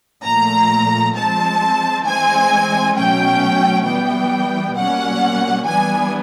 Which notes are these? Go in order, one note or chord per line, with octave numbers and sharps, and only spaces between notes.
A#2 F3 A3 A#5
F3 G#3 C4 A5
E3 G#3 C4 G#5
B2 F#3 A3 C#4 G5
E3 G3 B3 G5
B2 G3 A#3 C#4 F#5
E3 G3 B3 D4 G#5